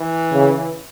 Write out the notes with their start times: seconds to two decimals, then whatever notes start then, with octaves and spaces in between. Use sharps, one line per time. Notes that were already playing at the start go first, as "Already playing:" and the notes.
Already playing: E3
0.33 C#3